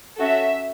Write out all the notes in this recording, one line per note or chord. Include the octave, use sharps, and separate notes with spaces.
C#4 F#4 A4 E5